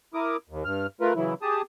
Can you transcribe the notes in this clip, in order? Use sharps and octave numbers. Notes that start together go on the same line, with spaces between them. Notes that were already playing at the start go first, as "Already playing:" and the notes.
E4 A#4 D6 D#6
D#2
G2 F6
A3 F4 A#4 B4
C#3 E3 F#3 E4
G4 G#4 A5 D#6